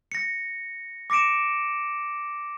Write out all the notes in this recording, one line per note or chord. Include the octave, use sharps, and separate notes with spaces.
A#6 C#7
D6 A#6 C#7 D7 E7